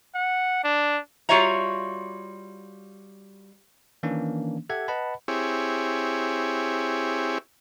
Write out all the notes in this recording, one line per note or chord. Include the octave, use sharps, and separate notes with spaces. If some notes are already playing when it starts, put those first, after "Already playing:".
F#5
D4
G3 F4 F#4 C#5 E5 A#5
D#3 E3 A#3 C#4 D4
G4 A4 E5 F#5 G#6
B4 D#5 F#5 A5 B5
C4 E4 G4 G#4 C#5